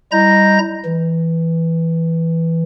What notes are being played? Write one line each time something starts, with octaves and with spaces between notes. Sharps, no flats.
G3 E4 D#5 A#5 G6 A#6
E3